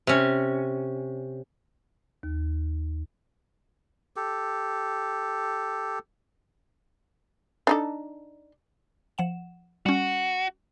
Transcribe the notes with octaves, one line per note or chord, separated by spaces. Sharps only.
C3 C#4
D#2
G4 A4
D4 D#4 A4
F3 F#5 E7
G3 C#4 F#4